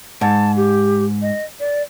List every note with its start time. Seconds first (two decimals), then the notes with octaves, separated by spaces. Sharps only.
0.21 G#2 A5
0.57 G4
1.22 D#5
1.60 D5